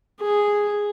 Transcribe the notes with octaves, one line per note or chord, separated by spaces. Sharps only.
G#4